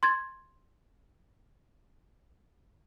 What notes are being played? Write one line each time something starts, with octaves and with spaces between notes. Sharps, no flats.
C6 G#6 A6